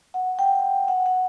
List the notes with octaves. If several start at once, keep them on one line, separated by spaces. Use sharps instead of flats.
F#5
G5
F#5
F#5